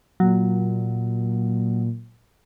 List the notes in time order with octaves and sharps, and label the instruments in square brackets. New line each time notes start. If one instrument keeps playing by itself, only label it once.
[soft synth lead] A#2 [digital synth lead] F#3